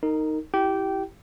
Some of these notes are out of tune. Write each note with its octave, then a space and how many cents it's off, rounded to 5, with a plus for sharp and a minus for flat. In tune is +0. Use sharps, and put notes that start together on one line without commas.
D#4 +0 A#4 -25
E4 +0 G4 -15 G5 -20